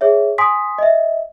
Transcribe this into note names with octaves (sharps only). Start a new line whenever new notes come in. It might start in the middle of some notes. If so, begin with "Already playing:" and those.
G#4 C#5 E5
G#5 C6 D#6 B6
D#5 E5